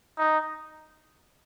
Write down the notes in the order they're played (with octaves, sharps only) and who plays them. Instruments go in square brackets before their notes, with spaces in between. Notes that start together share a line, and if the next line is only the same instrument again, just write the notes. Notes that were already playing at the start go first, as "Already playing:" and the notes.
[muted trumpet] D#4